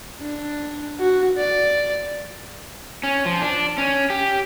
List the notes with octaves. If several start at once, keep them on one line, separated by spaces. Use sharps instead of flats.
D4
F#4
D5
C#4
F3
D4
C#4
G4